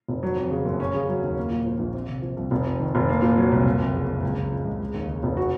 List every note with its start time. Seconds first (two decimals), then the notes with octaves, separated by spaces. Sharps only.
0.09 F1
0.23 F#3
0.36 F2
0.51 C#3
0.65 F#1
0.80 C#4
0.94 C#3
1.09 F#3
1.22 D#2
1.36 A#3
1.51 A#2
1.66 F3
1.79 A#1
1.94 C4
2.09 C3
2.22 F3
2.37 C2
2.51 F1
2.65 F2
2.80 D#3
2.95 F1
3.09 A#3
3.22 A#2
3.37 F#3
3.52 C2
3.65 F#1
3.80 F2
3.94 C#3
4.08 F#1
4.22 C#2
4.37 C#3
4.52 F3
4.65 C#2
4.80 G#3
4.94 D#2
5.08 C#3
5.23 F1
5.37 F#4